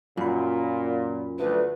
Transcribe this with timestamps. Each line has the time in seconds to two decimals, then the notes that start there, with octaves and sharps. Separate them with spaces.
0.17 F#2 A#2 F4 B5
1.39 D2 B4